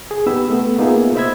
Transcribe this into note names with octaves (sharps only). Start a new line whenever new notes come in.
G#4
B3 D#4 G4 B5 E6
A3 B3
A#3 B3 D#4 F4 G#4 E5
C5 D#5 E5 B5 E6 G#6